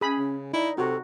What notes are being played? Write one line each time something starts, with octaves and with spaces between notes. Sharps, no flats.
C#4 G#4 B5
C#3
D#4 E4 D5
C3 F#4 A4